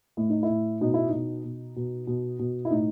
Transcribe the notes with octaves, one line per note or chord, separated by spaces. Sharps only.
A2 E4
D#4
E4
A2
B2 D#4
E4
B2 D#4
B2
B2
B2
B2
E4
A2 D#4